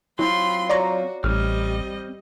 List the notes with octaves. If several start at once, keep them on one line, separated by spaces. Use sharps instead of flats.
F#3 C4 E4 F4 B5 C6
F#4 C#5 D5 A#5
A1 G3 C4 D#5 F6